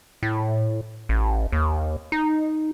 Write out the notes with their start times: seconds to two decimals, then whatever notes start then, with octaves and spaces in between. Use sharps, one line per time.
0.23 A2
1.09 A1
1.52 D#2
2.12 D#4